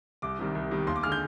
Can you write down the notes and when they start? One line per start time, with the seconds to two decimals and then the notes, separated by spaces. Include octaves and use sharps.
0.22 C2 D6
0.39 C3 D#3 G3
0.55 C2
0.71 C3 D#3 G3
0.87 D#2 C6
0.96 D6
1.03 D3 G#3 F6
1.12 G6